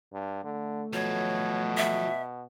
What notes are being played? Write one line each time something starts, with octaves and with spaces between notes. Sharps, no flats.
G2
D3 A3
B2 F3 F#3 C#5
E5